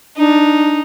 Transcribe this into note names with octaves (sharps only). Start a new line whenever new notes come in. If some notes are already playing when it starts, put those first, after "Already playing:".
D4 D#4